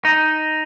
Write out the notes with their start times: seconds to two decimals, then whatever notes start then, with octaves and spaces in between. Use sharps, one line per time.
0.05 D#4